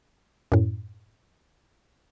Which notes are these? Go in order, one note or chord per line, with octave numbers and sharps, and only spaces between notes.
F#2 A2